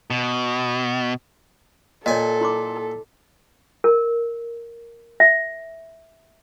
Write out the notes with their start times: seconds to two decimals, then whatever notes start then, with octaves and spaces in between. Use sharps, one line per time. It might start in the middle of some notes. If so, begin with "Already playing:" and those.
0.10 B2
2.06 A#2 A4 C#5 D#5 G#5
2.41 E4 C6 D6
3.84 A#4
5.20 E5